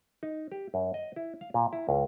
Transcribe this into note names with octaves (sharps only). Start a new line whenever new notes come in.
D#4
G4
F#2
D#5
E4
F5
A#2
E4
C#2